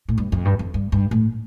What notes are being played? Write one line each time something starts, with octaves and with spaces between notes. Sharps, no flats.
A2
G2
F2
G2
F2
G2
G2
A2